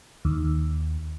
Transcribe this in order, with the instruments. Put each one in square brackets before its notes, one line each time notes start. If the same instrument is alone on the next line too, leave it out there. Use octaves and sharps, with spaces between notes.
[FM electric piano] D#2